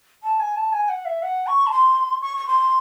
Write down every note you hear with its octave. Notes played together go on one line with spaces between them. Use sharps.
A5
G#5
A5
G#5
F#5
E5
F#5
C#6
A5
C6
C#6
C#6
C6